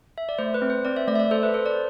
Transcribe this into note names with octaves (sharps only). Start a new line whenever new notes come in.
E5
D5
A3 C5
B4
C4
C5
C4 D5
E5
A3 D5
E5
D5
A4 C5
B4
A4 C5
D5